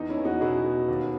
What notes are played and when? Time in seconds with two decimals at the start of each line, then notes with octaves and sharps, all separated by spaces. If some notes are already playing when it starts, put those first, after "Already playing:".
Already playing: E2 D#4
0.09 C#4 E4
0.17 E2
0.25 D#4 F#4
0.41 B2 E4 G#4
0.64 B2
0.89 D#2